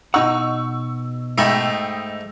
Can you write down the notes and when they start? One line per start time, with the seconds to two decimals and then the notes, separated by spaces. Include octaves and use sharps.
0.14 B2 D#4 F#5 C#6 E6
1.38 G#2 A3 D#5 G5 B5 E6